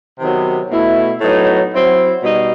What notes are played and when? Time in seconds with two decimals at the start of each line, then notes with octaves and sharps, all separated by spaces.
0.19 C3 D#3 F#3 B3
0.71 B2 A3 E4
1.21 A2 F#3 B3 D#4
1.71 F#3 C4 E4
2.23 B2 G3 D#4